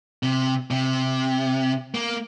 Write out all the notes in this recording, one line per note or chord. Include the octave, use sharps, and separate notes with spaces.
C3
C3
A#3